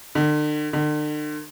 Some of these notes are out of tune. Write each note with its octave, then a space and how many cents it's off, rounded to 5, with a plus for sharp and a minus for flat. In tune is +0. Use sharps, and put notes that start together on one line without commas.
D3 +45
D3 +45